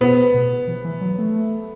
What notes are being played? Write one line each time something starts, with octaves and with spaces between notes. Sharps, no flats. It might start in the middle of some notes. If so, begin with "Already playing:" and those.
B2 B3
B2
E3
E3
F#3
A3